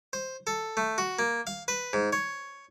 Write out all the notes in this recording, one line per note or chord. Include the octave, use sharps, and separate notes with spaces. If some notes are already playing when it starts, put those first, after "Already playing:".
C5
A4
A3
F#4
A#3
F5
B4
G#2
C#5